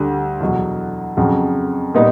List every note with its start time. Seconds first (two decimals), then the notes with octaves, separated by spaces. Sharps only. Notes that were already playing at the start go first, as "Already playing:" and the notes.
Already playing: D2 D3 G3
0.40 E2 B2 F#3
1.17 F2 C#3 F#3
1.94 A#2 G3 B3 D#4